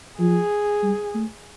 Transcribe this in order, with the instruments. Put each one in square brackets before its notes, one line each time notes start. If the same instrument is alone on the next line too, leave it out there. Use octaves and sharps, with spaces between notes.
[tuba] F3 [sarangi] G#4
[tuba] G3
A3